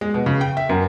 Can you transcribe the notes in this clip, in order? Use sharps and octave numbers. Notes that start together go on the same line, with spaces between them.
G#3
B2
C#3
G5
E5
F#2